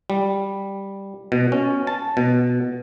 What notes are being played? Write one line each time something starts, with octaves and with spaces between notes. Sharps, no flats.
G3
B2
C#4
A5
B2